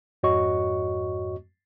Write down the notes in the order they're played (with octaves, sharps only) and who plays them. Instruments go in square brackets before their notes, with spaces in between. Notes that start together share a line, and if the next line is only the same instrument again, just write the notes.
[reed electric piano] F2 G#2 F#4 C#5 D#5 C#6